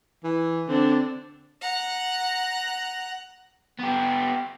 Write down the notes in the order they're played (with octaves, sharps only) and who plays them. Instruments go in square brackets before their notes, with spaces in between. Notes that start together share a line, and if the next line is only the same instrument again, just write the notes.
[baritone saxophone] E3
[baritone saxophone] D3 [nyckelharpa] C4 D4
[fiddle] F#5 A#5
[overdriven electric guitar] B3 G4